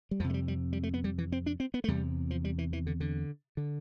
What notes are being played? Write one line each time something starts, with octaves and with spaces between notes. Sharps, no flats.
G3
F2 C3 F3
A3
G3
G3
G3
A3
B3
G3
E3
C4
D4
C4
B3
A3
E2 C3 G3
F3
G3
E3
E3
D3
D3
D3